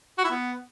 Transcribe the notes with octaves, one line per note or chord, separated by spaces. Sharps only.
F#4
E4
B3